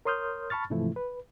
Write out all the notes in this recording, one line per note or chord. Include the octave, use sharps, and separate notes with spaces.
A#4 C#5 C6 D#6 F6 G6
A5 B5 C#6 F6 A6
G#2 C3 E3 F3 A3 E4
B4